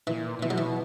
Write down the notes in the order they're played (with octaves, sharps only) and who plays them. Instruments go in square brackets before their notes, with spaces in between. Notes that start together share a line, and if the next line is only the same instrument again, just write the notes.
[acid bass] A#2 [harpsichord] E3
[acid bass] A#2
[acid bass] B2 [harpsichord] E3
[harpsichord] F#3
E3